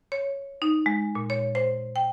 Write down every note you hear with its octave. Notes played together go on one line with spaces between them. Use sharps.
C#5
D#4
G#3
A#2
C#5
C5
G5